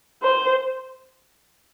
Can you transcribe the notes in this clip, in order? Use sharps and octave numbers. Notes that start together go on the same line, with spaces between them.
C5